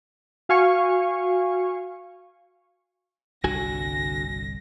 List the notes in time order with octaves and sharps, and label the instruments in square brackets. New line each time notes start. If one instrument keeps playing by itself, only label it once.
[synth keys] F#4 F5 G#5 C#6
[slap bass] G1 C2 G3 [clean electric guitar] D3 F#4 G#5 [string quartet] A#6